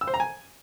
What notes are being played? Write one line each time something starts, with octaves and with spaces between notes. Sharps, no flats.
E6
C5
A#5
G#5